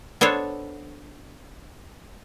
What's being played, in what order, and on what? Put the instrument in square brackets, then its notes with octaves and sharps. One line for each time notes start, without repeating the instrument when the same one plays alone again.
[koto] B3 D4 A4 C5 C#5